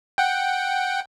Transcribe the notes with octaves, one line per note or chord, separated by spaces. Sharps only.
F#5 G5